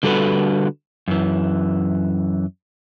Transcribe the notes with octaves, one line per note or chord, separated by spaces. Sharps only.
D3 G3 F#4 A4 B4
F#2 E3